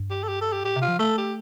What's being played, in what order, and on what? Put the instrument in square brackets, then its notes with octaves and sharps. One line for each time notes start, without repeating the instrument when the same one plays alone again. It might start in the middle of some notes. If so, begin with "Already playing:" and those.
Already playing: [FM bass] G2
[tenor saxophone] G4
A4
G4
A4
G4
[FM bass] A2 [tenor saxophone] G4
[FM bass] C3
[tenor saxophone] F4
[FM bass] F3
[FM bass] A3 [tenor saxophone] A4
[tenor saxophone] G4